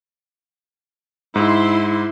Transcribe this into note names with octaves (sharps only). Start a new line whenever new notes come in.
G#2 E4 C6